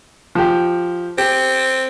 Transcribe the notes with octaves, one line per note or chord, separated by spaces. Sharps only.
F3 G4
C4 G4